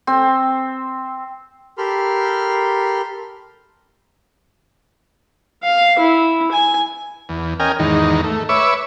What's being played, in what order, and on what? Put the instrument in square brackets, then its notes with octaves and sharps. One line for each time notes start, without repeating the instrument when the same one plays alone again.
[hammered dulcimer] C4
[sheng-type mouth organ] G4 A4 A#4 B5 C6 F6
[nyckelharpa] F5
E4
G#5
[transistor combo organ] E2
C#4 A#4 D#5 G5 G#5 F6
E2 G#2 D#3 D#4
A3
B4 C#5 E5 C#6 D6 E6